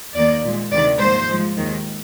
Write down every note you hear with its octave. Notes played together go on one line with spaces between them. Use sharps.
D#2 D#3 A#3 D5
A#2 G#3
D2 C3 D#3 D5
G#2 F3 A#3 C5
G#2 F3 G#3
D#2 D#3 G#3